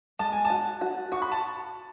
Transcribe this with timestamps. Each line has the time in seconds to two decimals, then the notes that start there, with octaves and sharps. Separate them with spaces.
0.19 G#3 A5
0.32 G#5
0.45 A5
0.50 F#4
0.81 F#4
1.12 F#4 C#6
1.22 B5
1.32 A5